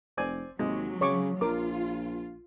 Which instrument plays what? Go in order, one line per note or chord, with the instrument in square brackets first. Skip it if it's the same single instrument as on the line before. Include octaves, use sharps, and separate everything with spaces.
[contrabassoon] F1 [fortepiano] C4 D5 G#5
[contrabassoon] D#2 [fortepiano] C3 G#3 [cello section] F#3
[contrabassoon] C#3 [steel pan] C#5 C#6 D6
[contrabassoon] A#1 [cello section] F4 [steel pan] A#4 D6